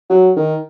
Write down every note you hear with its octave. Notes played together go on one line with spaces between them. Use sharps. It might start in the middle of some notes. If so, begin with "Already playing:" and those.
F#3
D#3